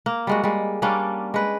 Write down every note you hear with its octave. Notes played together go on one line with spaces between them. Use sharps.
A#3
G3 G#3 F#4
G3 G#3
G3 A#3 C#4 D4
G#3 B4